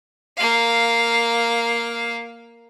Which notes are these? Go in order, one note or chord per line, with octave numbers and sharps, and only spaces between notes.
A#3 F5